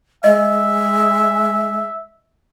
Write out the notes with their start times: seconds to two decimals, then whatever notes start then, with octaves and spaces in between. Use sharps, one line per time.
0.24 G#3 D#5 E5